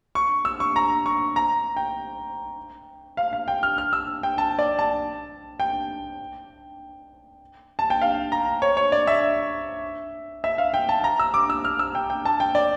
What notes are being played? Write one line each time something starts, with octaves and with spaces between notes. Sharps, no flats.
C#6
E6
C#6
A#5
C#6
A#5
G5
F5
F5
G5
F6
F6
E6
G5
A5
D5
A5
G5
A5
G5
F5
A#5
C#5
C#5
D5
E5
E5
F5
G5
A5
A#5
E6
D6
E6
F6
E6
G5
G5
A5
G5
D5